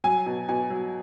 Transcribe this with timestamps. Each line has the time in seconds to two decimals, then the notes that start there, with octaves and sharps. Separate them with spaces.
0.04 F#3 G#5
0.26 B2
0.49 B2 G#5
0.70 F#3